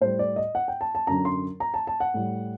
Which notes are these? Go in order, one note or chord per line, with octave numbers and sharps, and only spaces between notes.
A2 G3 C5
D5
D#5
F#5
G5
A5
A5
F#2 D3 F#3 A#5
C6
A#5
A5
A5
F#5
A2 G3